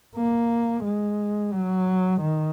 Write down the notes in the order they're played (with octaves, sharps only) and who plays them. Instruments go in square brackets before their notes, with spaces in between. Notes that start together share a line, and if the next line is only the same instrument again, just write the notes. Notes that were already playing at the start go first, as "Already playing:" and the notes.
[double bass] A#3
G#3
F#3
D#3